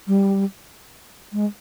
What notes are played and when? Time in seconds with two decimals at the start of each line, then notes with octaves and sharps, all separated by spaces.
0.07 G3
1.33 G#3